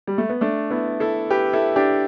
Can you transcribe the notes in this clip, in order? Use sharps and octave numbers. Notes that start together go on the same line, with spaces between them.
G3
A3
B3
A3 D4
B3 E4
E4 A4
G4 B4
E4 A4
D4 G4